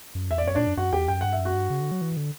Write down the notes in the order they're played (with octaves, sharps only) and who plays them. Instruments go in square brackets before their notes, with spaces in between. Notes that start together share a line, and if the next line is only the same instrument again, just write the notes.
[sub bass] F#2
[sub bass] E2 [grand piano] E5
[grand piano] D5
[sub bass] F#2 [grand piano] C#5
[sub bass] A#2 [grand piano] D4 D5
[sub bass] F#2
[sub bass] F#2 [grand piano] F#4 F#5
[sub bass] E2 [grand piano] G4 G5
[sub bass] F#2 [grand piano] G5
[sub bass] G2 [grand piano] F#5
[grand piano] E5
[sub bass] F#2
[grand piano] F#4 F#5
[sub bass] G2
C#3
D3
F#3
E3
D3